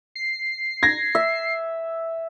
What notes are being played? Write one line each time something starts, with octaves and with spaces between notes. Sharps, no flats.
C7
G#6 A#6
E5